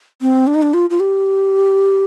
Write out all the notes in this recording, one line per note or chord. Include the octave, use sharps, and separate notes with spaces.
C4
D4
D#4
D4
F4
F4
G4